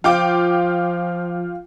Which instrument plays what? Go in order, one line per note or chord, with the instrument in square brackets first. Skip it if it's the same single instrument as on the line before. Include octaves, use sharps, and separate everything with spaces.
[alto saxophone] F3 [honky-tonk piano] F4 G5 D6